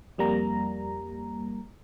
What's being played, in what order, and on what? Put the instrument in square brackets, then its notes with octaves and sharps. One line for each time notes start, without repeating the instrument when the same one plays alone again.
[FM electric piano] F2 G3 A#3 A#5